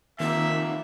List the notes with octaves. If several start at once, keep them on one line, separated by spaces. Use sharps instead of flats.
C3 D#3 F3 A#3 E5